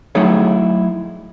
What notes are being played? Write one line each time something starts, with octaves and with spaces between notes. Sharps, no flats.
F#3 A3 D#4 E4 G#4 C#5